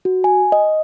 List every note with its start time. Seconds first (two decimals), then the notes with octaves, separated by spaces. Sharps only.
0.05 F#4
0.24 G#5
0.52 D#5